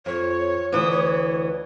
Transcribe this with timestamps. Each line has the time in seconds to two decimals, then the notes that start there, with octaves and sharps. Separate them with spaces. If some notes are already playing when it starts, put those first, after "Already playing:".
0.06 F2 C#5
0.72 D2 E3 D#6
0.91 C#5